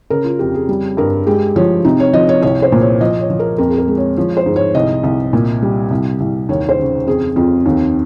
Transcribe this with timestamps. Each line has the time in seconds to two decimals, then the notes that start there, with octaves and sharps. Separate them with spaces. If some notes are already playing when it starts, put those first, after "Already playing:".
0.10 C#3 A#4
0.25 F4
0.39 F2 G4
0.54 G#4
0.69 G3
0.97 G2 A#4
1.27 G#3 G4
1.56 F3 C#5
1.85 C3 D#4
2.00 C#5
2.13 F3 D#5
2.29 C#5
2.42 C2 C#5
2.62 C5
2.72 A#2
2.81 C#5
3.01 F3 D#5
3.20 C#5
3.30 F3
3.39 A#4
3.58 F2 A#4
3.68 G#4
3.78 A#4
3.88 G#3
3.97 C#5
4.17 F3 C#5
4.37 C5
4.46 G#2
4.56 C#5
4.75 C2 D#5
5.03 C2
5.33 A#2
5.62 G3
5.90 C2
6.20 C2
6.49 D#2 C#5
6.69 C5
6.78 C#3
7.07 F2 G#4
7.36 F2 F4
7.66 D#2